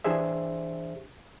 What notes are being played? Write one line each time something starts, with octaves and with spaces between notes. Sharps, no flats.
E3 D4 G4 G#4 C5 E5